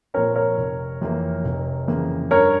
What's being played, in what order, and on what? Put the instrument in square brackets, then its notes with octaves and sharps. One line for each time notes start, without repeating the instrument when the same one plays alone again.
[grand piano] A#2 F3 C4 [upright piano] A#4 C#5
[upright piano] A#4 C#5
[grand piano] F1
F2 C3 E3 A#3
F1
F2 C#3 E3 A#3
[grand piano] G2 [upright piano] A#4 C#5